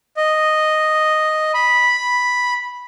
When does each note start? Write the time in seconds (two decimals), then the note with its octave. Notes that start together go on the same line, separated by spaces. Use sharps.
0.17 D#5
1.54 B5